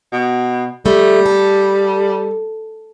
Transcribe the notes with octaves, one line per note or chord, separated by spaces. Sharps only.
B2
G3 A3
A4